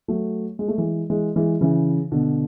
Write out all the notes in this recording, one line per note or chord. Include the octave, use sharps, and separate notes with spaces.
F#3 A3
G#3
A3
E3 G#3
E3 G#3
E3 G#3
C#3 E3
B2 D3